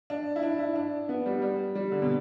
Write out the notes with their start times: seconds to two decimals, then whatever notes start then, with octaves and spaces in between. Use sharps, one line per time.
0.10 D4
0.36 E4
0.43 D4
0.59 E4
0.76 D4
1.09 B3
1.26 G3
1.42 G3
1.75 G3
1.92 D3
2.02 B2